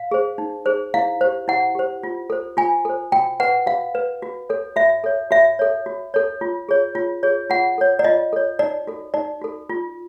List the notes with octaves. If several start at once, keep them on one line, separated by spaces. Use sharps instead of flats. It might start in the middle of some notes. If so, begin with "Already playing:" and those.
Already playing: F5
G#4 C5
D#4
G#4 C5
E4 F5
G4 C5
E4 F#5
G4 C5
F4
A4 C5
F4 G#5
A4 C5
F#4 G5
B4 F#5
F#4 F5
B4
F#4
A4 C#5
F#4 E5
A4 C#5
F#4 E5
A4 C#5
F#4
A4 C#5
F4
G#4 C#5
F4
G#4 C#5
F4 F#5
A4 C#5
D5
F4 D#5
A4 C#5
D#4 D5
F#4 A4
D#4 D5
F#4 A4
F4